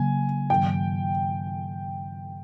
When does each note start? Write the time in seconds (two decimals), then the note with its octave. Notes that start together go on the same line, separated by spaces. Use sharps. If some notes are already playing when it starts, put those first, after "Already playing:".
Already playing: C#3 F#3 A#3 G#5
0.49 G2 D#3 F#3 G5